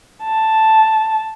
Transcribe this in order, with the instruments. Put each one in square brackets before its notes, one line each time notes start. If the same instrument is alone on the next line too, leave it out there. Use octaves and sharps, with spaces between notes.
[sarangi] A5